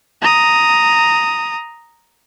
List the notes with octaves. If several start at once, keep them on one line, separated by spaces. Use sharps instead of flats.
A#5 D#6